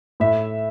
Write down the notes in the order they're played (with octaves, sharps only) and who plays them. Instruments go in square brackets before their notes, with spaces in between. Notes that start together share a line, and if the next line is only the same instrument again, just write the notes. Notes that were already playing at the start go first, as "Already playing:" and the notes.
[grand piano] A2 E5